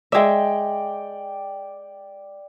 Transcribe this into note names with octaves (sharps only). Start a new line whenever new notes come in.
G#3 D5 E5 G5